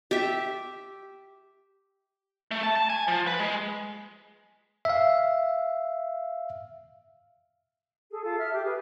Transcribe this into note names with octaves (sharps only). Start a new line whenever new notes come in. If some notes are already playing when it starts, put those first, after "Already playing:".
G4 E5
A3
A5
A5
G#5
F3
B4
G#3
E5 F5
G#4 A4
F4 A4
E5 F6
G4 D6
G#4 B4